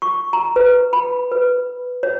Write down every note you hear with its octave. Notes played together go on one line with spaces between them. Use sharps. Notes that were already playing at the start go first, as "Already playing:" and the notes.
C#6
A#5
B4
B5
B4
C#5